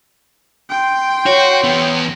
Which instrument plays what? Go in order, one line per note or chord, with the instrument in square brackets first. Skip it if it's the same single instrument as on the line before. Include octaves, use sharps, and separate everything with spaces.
[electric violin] G5 C6
[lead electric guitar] F#4 [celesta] C#5
[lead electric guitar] E2 B3